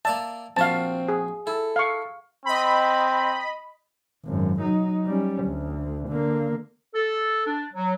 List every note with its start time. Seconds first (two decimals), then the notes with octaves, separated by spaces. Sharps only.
0.05 A#3 D5 E5 A5
0.57 A#1 C4 F#4 F5 A5
1.08 G#4
1.47 E4 A4
1.76 F5 C#6
2.45 C4 D#5 B5
4.25 G#1 F#2
4.61 F#3 D#4
5.06 G3 C#4
5.44 D2
6.09 D3 A#3
6.95 A4
7.47 D4
7.73 F#3